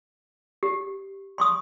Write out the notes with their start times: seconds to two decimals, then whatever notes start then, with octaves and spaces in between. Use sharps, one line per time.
0.63 G4
1.38 C6 C#6 D#6